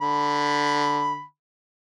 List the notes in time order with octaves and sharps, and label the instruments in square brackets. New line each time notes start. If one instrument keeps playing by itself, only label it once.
[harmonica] D3 B5